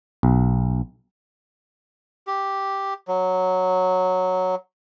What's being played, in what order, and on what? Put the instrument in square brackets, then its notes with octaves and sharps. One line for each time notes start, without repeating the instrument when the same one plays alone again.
[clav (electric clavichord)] B1
[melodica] G4
F#3